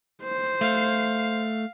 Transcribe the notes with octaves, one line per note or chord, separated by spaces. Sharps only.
C5
A3 F5